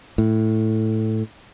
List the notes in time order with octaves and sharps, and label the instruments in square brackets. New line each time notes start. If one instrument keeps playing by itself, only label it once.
[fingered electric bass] A2